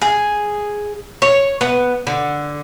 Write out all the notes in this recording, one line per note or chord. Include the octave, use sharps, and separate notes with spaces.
G#4
C#5
B3
D3